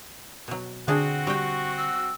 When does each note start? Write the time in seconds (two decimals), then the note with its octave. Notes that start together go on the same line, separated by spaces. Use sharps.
0.48 B2 F#3
0.88 D3 C4 D4 F#4 G#4
1.27 G3 G5 C#6
1.77 E6